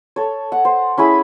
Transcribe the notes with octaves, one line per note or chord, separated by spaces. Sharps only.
A4 C#5
F#5
C5
C#4 E4 G#4 B5